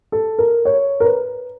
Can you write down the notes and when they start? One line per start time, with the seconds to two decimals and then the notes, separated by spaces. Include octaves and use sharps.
0.12 A4
0.39 A#4
0.65 C#5
1.00 A#4
1.04 B4